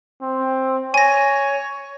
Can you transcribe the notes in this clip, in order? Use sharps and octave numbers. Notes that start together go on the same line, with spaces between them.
C4
C#5 G#5 A#6